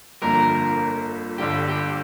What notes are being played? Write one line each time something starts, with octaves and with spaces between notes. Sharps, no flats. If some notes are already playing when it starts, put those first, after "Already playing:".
G1 F2 D3 A#3 D4 A#4
G1 G2 D3 G4
G4